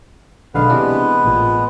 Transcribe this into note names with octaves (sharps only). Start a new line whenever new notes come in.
B1 D3 G#3 B3 B4 F5
C3 E3 D4
A1 A#2